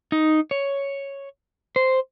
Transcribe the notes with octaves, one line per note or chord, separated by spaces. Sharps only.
D#4
C#5
C5